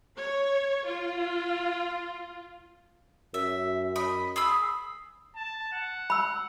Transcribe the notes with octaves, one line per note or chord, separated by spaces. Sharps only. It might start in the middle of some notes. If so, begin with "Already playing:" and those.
C#5
F4
F#2 E5
D#5 B5
G#4 B5 E6
A5
F#5
B5 E6